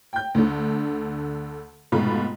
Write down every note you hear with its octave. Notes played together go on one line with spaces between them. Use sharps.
G5 G6
D2 D3
F1 G#2 B2 A3 F4 B5